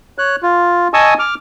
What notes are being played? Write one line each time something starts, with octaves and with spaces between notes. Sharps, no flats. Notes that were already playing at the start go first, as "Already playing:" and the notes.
C#5 F#6
F4
D#5 G#5 A5 C#6 D#6 E6
D6 F6